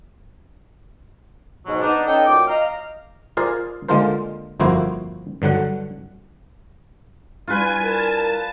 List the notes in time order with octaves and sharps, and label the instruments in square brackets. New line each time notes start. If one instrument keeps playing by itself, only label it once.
[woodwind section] G#2 B2 F#3
B3 D4 D#4
C#4 D#4 A4 D#5 G5
A#2 F#3 G5 D6
D#5 F5 A#5
[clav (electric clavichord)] F4 G#4 A#4 C5 D5 F5
D3 G#3 A#3 F4 A#4 C5
G1 F2 A#3 E4 F#4 C5
G2 D3 F#3 F#5
[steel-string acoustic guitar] G3 D4 E4 [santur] F4 B4 [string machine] G#5
[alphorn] A#4 [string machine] A5